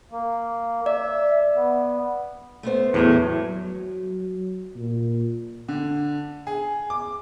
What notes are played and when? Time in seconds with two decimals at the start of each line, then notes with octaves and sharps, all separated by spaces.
0.12 A#3
0.86 D5 E5
1.56 B3
2.63 A3 B3 C5
2.94 E2 A2 E3 F#3 E4
3.42 F#3
4.76 A#2
5.68 D3
6.47 G#4
6.90 D6